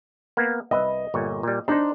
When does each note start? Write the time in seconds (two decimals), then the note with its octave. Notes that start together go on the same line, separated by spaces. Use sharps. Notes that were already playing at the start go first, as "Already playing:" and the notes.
0.37 A#3 B3
0.71 C2 B4 D#5 E5
1.14 G1 A#2 C#5
1.43 A#2 G3
1.68 D4 D#4 C5